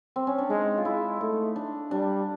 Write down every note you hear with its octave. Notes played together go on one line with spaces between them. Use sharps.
C4
C#4
D4
G#3 D#4
F4
G#3 E4
A3 D#4
D4
G3 D4